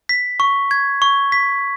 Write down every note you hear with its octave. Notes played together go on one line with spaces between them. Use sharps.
B6
C#6
G#6
C#6
B6